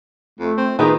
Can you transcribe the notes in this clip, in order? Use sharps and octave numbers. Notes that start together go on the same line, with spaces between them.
F2 A3
C4
D#3 B3 D#4 F4 G4 G#4 B4